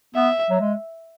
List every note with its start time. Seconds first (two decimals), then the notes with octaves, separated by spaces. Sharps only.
0.15 B3 E5
0.50 F#3
0.60 G#3